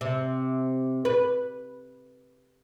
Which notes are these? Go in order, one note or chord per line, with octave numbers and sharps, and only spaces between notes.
C3
B4